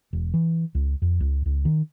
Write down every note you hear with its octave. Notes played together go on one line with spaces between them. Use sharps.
E1
E3
C#2
F2
C#2
C#2
D#3